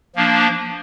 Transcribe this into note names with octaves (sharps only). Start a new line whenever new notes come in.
F3 A#3 D4